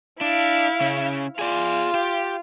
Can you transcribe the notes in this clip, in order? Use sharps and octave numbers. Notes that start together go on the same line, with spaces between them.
D4 E4 F5
C#3 C#4
F4 G#4 D5
G4